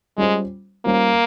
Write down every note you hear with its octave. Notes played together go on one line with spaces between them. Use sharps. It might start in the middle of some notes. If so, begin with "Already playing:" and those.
G3 G#3 C#4 F4 C5
G3 A#3 C#4 F4 C5